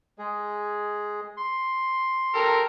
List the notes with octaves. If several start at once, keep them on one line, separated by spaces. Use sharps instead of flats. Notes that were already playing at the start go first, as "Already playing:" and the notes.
G#3 G#4
C6
G4 A4 A#4